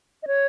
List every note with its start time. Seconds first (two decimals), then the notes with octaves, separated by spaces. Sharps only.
0.23 D#5
0.27 C#5